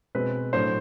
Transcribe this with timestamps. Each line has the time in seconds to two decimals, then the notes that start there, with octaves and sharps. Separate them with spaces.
0.15 B2 G#3 C4 B4
0.53 A2 F#3 A3 D4 C5